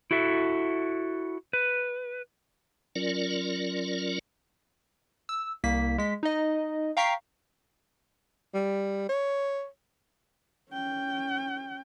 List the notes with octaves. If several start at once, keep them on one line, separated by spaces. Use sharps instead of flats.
E4 F#4 A4 E5
B4
F#3 C#4 F4 A#4 D5
E6
C2 A#3 B6
G#3 B6
D#4 D#5
F5 G5 A#5 C#6 B6 C7
G3
C#5
C#4 G5